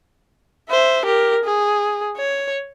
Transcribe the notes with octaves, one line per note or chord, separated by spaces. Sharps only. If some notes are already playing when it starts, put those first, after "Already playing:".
C5 E5
G4 A#4
G#4
C#5